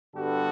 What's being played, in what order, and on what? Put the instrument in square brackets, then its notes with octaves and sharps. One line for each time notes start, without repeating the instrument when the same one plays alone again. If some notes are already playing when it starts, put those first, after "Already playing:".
[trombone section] G2 D3 G3 B3 F#4 A4